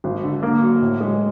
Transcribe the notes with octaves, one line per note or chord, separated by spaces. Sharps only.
G#1
D3
A#3
F#3
A2
G#3